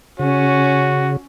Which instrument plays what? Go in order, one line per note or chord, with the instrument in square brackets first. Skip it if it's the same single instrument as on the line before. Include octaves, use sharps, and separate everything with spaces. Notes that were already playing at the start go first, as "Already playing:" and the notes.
[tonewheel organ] C#3 [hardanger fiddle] C#4 [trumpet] F#4